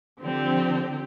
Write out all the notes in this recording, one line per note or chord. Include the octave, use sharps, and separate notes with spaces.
D3 F3 C4 G4